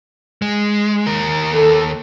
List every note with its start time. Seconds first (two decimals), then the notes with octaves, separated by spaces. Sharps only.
0.42 G#3
1.07 D#2 A#4
1.52 A4